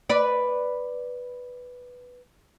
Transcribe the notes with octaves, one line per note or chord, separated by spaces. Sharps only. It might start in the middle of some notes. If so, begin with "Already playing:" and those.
B4 D5